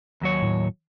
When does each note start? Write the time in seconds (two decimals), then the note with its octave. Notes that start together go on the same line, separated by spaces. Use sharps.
0.22 D#2 F#3 C#5
0.42 A2